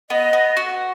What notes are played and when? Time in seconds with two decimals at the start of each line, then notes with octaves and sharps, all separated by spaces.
0.10 B3 D#5
0.33 B3
0.57 F#4